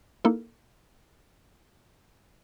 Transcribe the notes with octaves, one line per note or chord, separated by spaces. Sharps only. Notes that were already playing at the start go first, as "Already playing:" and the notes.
A#3 D#4 E4 A4 A#4